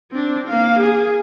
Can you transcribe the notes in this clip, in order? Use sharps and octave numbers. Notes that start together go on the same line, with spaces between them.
C4 D4
A#3 F5
G#4